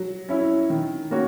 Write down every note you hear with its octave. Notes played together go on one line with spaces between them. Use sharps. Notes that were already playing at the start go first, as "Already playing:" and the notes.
Already playing: F#3
C#4 E4
D#3
A#3 C#4 F#4 C#5